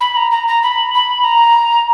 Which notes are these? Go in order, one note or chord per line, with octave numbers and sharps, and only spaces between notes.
B5
A#5
A#5
A#5
B5
B5
A#5